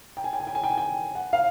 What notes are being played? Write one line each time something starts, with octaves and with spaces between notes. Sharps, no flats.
G5
G#5
G5
G#5
G5
G#5
G5
G#5
G5
F#5
F5